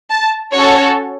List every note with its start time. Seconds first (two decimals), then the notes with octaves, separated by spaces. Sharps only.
0.10 A5
0.52 C#4 F#4 A4 C#5